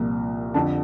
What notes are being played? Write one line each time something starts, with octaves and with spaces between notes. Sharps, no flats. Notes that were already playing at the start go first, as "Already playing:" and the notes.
Already playing: C2 A#2 F3 A#3
F2 D3 F3 A5